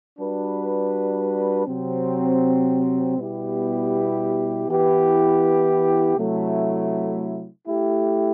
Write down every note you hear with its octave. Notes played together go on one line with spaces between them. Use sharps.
G3 D4 F#4 B4
C3 F#3 C4
B2 G3 B3 E4 G4
E3 B3 E4 G4 B4
C3 F#3 A3 E4
A3 E4 G4